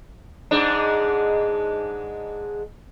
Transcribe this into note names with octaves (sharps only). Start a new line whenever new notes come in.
G#2 G#3 D4